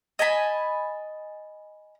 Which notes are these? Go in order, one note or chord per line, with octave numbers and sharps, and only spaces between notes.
D#5 G#5 A5 B5